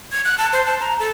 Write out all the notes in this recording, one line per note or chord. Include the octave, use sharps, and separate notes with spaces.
G#6
F#6
A5
C5
A5
A#5
A4